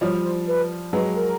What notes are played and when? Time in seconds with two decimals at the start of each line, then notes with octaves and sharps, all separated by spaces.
0.01 F3 G3 C#5
0.24 C5
0.47 B4
0.93 F#3 G#3 B4
1.16 A#4